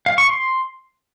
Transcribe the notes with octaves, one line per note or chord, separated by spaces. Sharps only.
F5
C#6
C6